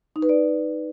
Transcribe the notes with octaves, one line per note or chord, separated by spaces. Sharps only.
D#4
B4
D5